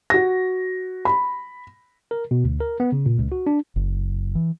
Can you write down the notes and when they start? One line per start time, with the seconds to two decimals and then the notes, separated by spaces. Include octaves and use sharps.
0.10 F#4 A#6
1.05 B5
2.11 A#4
2.31 B2
2.44 D2
2.60 A#4
2.80 B3
2.92 C#3
3.06 A#2
3.18 C#2
3.32 F#4
3.47 D4
3.76 F#1
4.35 E3